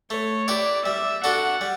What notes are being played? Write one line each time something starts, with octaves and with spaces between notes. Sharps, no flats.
A3 C#5
E4 G4 B4 D5
G3 E5
D4 F#4 A4 F#5
G3